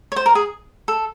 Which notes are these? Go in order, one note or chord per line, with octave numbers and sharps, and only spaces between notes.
C#5
C5
A#4
G#4
A4